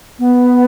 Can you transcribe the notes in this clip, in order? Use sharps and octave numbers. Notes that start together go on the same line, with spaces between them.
B3